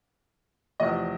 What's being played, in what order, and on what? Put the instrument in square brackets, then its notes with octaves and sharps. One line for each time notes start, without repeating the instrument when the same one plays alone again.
[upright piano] E2 C3 F3 A3 D#5